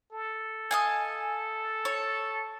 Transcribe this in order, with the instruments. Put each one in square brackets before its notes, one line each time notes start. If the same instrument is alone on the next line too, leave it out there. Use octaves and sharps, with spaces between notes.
[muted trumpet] A4
[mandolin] D#5 F5 G#5
C#5